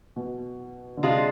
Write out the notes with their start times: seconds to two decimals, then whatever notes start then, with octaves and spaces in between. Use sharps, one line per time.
0.16 B2
0.97 D3
1.03 C3 G#3 D4 F4